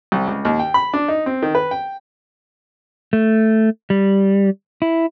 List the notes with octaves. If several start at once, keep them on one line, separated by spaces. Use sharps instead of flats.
C2
C#2
D#2
G5
B5
D4
D#4
C4
D#3
B4
G5
A3
G3
E4